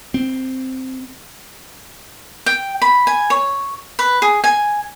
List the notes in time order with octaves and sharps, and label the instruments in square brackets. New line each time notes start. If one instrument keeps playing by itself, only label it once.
[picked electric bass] C4
[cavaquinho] G5
B5
G#5
C#5
B4
G#4
G#5